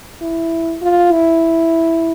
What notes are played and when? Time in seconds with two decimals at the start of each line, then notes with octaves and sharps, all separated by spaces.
0.22 E4
0.82 F4
1.12 E4